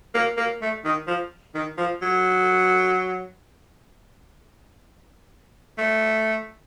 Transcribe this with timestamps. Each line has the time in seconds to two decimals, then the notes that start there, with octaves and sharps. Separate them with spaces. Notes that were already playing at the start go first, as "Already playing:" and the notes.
0.15 A#3
0.37 A#3
0.62 A3
0.85 D#3
1.07 F3
1.55 D#3
1.78 F3
2.02 F#3
5.78 A3